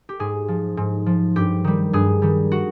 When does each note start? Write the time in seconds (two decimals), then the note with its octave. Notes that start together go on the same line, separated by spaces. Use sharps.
0.09 G4
0.19 G#2 G#4
0.48 F3
0.77 G#2
1.06 F3
1.36 G2 G4
1.64 D#3 G3
1.93 G2 G#4
2.22 D#3 G3
2.52 F#4